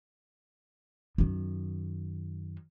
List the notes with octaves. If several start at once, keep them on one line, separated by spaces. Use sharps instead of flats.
F#2 D#3